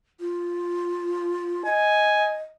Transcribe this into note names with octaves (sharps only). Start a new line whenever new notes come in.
F4
D#5 G#5